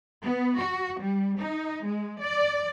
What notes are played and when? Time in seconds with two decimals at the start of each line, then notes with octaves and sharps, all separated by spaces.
0.23 B3
0.60 F#4
1.01 G3
1.39 D#4
1.85 G#3
2.21 D5